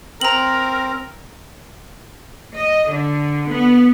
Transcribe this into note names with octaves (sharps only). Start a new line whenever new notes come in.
C4 A#4 A#5 F#7
D#5
D3
B3